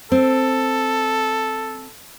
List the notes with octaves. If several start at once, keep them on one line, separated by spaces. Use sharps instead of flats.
C4 A4